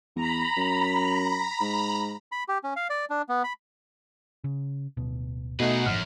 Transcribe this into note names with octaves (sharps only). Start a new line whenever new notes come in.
E2 A#5 B5
F#2
G#2
B5
G4
C#4
F5
D5
D4
B3
B5
C#3
D1 B2
B2 A3 D#4 G#4 B4 F#5
G1 F#2 A2 F3 F6